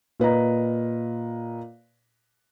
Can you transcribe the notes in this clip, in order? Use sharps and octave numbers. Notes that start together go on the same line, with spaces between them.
A#2 B4 D#5 A#5